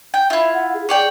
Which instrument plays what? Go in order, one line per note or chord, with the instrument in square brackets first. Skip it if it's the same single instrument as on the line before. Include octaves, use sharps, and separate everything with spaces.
[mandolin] G5
[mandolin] E4 F4 [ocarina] E5
[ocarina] F#5
G#4
[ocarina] G#4 [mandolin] C#5 D5 G5